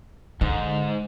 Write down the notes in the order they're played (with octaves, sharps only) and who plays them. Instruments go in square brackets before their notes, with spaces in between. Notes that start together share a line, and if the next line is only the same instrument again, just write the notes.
[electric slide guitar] G#2 [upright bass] D3